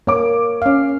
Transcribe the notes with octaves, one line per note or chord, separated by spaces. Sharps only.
A#3 C#5 D6
C#4 F5